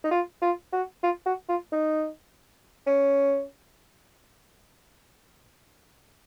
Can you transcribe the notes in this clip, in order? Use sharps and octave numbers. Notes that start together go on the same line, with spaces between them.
D#4
F4
F4
F#4
F4
F#4
F4
D#4
C#4